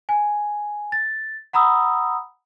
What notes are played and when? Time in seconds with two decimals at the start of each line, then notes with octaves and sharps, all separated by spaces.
0.09 G#5
0.92 A6
1.53 F#5 A#5 B5 D#6 E6